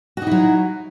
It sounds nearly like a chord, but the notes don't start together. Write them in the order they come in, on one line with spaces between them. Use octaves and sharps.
F#4 D#4 E4 F#3